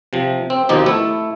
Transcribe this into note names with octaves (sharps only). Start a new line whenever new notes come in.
C3 F3
C4
D#2 B2 F3 C4 D#4 G4
A3 E4 A4